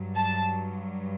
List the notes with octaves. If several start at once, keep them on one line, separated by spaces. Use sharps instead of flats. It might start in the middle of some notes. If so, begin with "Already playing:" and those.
Already playing: G2 F#3
A5